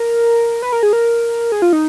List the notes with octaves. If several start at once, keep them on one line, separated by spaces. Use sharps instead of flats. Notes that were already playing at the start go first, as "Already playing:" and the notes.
Already playing: A#4
B4
A#4
G#4
A#4
G#4
F4
D#4